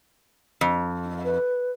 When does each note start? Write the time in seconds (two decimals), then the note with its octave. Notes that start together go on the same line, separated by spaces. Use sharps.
0.61 F2
1.24 B4